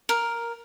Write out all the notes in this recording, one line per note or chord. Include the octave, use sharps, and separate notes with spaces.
A#4